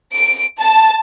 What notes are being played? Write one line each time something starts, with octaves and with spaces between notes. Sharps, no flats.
D7
A5